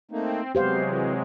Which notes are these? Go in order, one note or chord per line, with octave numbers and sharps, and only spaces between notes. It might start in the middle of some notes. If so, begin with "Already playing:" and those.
A3 A#3 C4 D#4
C3 F#3 G#3 B3 G4 C5 F5
E3